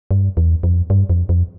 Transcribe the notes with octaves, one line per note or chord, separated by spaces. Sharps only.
G2
E2
F2
G2
F2
F2